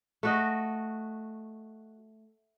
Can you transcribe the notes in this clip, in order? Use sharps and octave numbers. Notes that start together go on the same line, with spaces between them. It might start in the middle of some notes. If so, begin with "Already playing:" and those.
A3 F#4 D#5